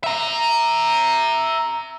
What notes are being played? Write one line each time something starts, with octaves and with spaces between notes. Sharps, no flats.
E5 A#5